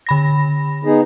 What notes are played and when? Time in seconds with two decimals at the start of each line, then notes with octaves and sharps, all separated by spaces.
0.07 D3 B5 A#6
0.85 B3 D#4 G#4